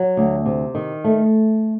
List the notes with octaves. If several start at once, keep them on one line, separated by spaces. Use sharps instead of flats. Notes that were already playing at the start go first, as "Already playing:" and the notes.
Already playing: F#3
D2
C3
D#3
A3